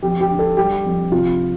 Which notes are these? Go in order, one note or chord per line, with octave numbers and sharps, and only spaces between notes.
F2 G4
G4
D3
A4
G3 G4
F2
C3 F4